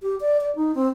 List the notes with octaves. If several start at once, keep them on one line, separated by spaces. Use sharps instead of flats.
G4
D5
D5
D#4
C4